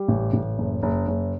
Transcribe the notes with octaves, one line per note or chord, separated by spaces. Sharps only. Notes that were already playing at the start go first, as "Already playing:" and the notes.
Already playing: G3
A1
A1
F#1
F#1
F#1